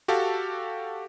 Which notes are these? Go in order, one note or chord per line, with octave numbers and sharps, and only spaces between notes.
F#4 G4 A4 F5 A5